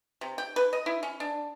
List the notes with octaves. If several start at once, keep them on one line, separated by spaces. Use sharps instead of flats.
C3
G5
B4
D#5
E4
C#4
D4